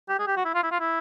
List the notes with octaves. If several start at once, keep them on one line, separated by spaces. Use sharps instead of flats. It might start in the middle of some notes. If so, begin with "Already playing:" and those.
G4
G#4
G4
F#4
E4
F4
E4
F4
E4